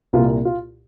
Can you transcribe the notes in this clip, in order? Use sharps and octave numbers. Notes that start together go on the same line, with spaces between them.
C2 A#2 F4
F4